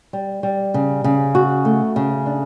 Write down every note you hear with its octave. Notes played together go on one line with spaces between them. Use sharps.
G3
G3
C#3
C#3
F#4
A3
C#3
D4